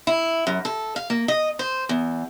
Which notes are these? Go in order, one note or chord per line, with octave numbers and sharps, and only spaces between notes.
E4
F#2
A4
F5
A#3
D#5
C5
E2